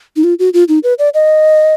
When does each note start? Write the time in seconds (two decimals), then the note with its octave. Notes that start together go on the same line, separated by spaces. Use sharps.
0.16 D#4
0.24 F4
0.39 F#4
0.54 F4
0.69 D#4
0.83 B4
0.99 D5
1.14 D#5